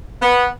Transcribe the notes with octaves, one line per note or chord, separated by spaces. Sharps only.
B3